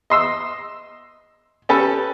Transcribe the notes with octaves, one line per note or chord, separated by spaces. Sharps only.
D#5 C6 E6
C#4 G4 A4 B4